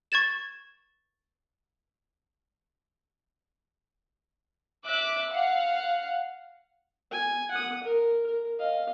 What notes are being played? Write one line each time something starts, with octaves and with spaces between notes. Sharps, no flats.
C#6 G#6 A6 E7
E5 D6 F#6
F5 F#5
G#5
F#5 D#6
A#4
A#4
D#5 F5